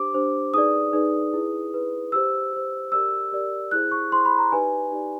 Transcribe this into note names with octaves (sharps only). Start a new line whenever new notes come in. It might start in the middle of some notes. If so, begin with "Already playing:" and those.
Already playing: D4 G4 C5 D6
D4 G4 C5
D#4 G#4 B4 D5 D#6
D#4 G#4 B4 D5
E4 G#4 B4
E4 G#4 B4
G4 C5 E6
G4 C5
G4 A#4 D5 E6
G4 A#4 D5
E4 G#4 C5 F#6
C#6
E4 G#4 C5 C6
B5
A#5
D#4 G4 B4 D5 G#5
D#4 G4 B4 D5